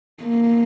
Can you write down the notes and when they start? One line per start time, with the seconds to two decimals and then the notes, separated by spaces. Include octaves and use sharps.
0.23 A#3